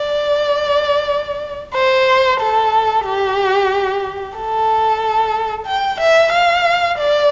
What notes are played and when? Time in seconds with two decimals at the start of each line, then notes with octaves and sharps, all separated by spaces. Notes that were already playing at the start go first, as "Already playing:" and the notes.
Already playing: D5
1.74 C5
2.40 A4
3.06 G4
4.36 A4
5.66 G5
6.00 E5
6.32 F5
6.98 D5